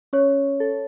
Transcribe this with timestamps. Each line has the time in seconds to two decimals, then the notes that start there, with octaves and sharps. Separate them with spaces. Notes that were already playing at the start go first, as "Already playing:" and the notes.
0.13 C#4 C#5
0.60 A4